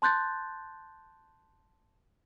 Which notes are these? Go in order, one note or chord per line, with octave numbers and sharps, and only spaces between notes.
A5 C6 F#6 G6 A6